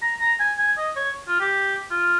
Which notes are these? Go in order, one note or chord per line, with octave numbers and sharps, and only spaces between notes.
A#5
A#5
G#5
G#5
D#5
C#5
F4
G4
F4